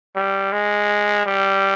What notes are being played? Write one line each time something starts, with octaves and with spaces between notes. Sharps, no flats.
G3
G#3
G3